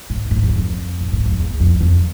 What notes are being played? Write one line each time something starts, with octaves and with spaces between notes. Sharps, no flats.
G#2
G#2
E2
F2
A2
G#2
F2
E2
F2
F2